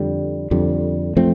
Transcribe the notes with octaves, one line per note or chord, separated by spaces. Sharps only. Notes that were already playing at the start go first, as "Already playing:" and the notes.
Already playing: F2 D3 G3
F2 D3 G3
F3 A3 C4